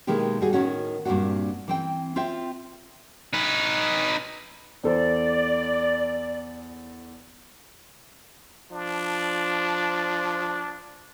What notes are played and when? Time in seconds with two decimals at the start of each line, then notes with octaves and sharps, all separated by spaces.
0.07 B2 D#3 G#3 A#3 E4 G4
0.41 G3 F#4 G#4
0.53 A2 D#3 C#4 F#4
1.05 G2 A#2 A#3 C4 D4 F#4
1.68 E3 C4 G5
2.16 C4 F4 C5 E5 G5
3.33 D#4 B4
4.84 E2 A4 C5 D5
8.72 F3 D4